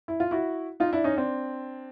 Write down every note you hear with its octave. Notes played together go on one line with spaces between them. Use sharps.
E4
F4
E4 F#4
D#4 F4
D4 E4
C#4 D#4
C4 D4